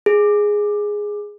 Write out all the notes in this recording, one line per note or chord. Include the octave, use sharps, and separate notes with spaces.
G#4